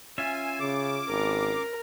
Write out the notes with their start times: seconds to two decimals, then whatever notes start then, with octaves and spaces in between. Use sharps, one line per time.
0.18 C#4 F4 E5 G#5
0.60 C#3 D6
1.09 G#1 A#4